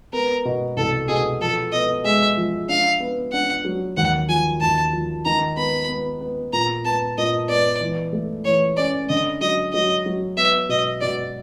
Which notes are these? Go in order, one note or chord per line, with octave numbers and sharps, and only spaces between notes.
B3 A#4
B2
C2 A4
B2 G#4
F3 A4
B3 D#5
G#3 E5
F3
D4 F5
B3
D4 F#5
F#3
D#2 F#5
F3 G#5
D#2 A5
F3
D#3 A#5
B3 B5
B3
B3
A#2 A#5
B3 A5
A#2 D#5
B3 D5
E3
A3
E3 C#5
C#4 D5
D3 D#5
F#3 D#5
F#3 D#5
F#3
B3 E5
B2 D#5
B2 D5